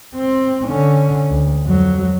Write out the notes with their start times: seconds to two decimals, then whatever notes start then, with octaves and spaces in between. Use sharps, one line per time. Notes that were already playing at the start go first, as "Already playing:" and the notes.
0.16 C4
0.67 D3 C#4
1.30 D2
1.65 F2 F#3